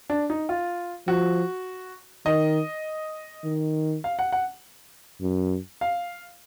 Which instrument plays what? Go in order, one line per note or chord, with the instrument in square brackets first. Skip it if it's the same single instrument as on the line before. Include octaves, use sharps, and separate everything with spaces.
[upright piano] D4
D#4
F4
[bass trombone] F3 [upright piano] F#4
[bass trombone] D#3 [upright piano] D#5
[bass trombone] D#3
[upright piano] F5
F#5
F#5
[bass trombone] F#2
[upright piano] F5